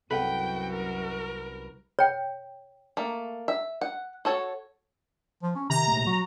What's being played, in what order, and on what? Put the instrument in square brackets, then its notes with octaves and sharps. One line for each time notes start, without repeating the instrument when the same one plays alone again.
[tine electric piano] C2 B4 B5 [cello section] F#2 F#4 [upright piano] A4 F#5 [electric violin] G5
[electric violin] A#4
[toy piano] C#5 G5
[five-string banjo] A3 A#3
E5
F#5
F#4 A4 C#5
[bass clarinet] F3
C#4
[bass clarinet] C3 [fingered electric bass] D#3 [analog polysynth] A#5
[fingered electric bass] A#2 G#3 A3
[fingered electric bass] F#3 [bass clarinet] F#4